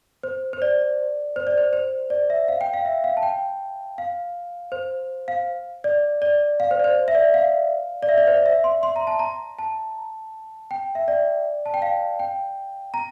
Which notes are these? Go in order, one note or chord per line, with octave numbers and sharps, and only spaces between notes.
C5
C5
D5
C5
D5
C5
C5
D5
E5
F5
G5
F5
E5
F5
A5
G5
F5
C5
F5
D5
D5
F5
C5
D5
C5
E5
D5
F5
D5
E5
D5
C5
D5
E5
C6
C6
A#5
A5
A#5
A5
G5
E5
D5
A5
G5
F5
G5
A#5